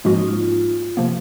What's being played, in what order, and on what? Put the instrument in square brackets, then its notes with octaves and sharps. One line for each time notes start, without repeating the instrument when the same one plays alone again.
[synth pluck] G#2 F3 G#3 C#4 F#4 [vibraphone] A#3
[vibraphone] D#4
F4
F4
[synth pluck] C3 F3 A#3